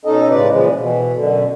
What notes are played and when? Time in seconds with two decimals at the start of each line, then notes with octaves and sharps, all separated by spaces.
0.05 B2 C#4 D#4 A4 D#5
0.30 A2 C#3 G#3 B4 D5
0.51 A#2 C#3 E3 F3 G#3
0.77 B2 E3
1.13 F#2 B2 D3